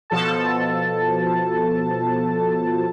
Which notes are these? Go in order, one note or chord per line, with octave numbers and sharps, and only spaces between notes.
B2 F3 A4 A5